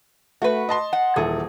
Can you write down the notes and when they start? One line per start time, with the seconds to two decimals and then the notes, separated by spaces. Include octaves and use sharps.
0.42 A3 F#4 B4
0.69 D#5 A5 C6
0.93 F#5
1.16 D#1 E3 G#4 A4